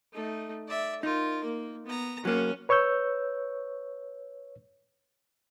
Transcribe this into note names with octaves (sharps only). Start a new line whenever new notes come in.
A3 D#4
D5 E5
D#4 F4 A#4
A#3
B3 A#5
F#3 A#3 C#4
B4 C#5 C#6 E6 G6